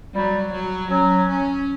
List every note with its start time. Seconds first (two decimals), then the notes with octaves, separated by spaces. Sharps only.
0.15 F#3 G3
0.53 F#3
0.91 F#3 C#4
1.29 C#4